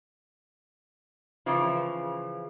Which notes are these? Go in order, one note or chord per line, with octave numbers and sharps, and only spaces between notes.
C#3 E3 F3